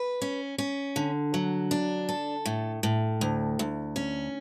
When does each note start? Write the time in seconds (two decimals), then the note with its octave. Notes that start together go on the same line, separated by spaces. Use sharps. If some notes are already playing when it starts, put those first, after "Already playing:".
Already playing: B4
0.22 C#4
0.58 C#4
0.96 D3
1.34 F#3
1.71 D4
2.09 A4
2.46 A2
2.83 A2
3.21 D2
3.59 D2
3.96 C#4